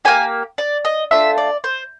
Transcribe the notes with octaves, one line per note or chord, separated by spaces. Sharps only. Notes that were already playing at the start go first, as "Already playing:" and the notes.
A#3 D4 G4 G#5
D5
D#5
A3 D4 F4 E5
D5
C5